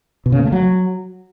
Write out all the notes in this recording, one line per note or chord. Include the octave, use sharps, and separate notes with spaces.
B2
C#3
A#3
A3
F#3